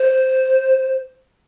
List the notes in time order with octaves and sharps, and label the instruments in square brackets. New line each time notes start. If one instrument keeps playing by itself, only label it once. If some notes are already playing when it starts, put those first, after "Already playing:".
Already playing: [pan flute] C5